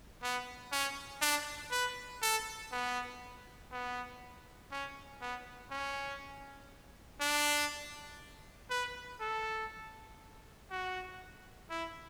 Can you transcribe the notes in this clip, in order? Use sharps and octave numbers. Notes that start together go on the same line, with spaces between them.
B3
C#4
D4
B4
A4
B3
B3
C#4
B3
C#4
D4
B4
A4
F#4
E4